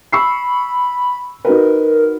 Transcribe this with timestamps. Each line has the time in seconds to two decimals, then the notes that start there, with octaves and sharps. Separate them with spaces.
0.13 B5 C#6 E6 C7
1.45 D#4 F#4 A#4 B4